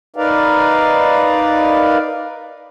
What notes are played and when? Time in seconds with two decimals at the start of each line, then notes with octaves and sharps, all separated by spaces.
0.16 D#4 A#4 B4 D5 F5